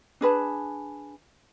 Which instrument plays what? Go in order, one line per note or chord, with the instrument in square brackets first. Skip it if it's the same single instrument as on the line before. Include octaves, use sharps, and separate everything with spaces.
[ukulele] D4 G#4 B4 A5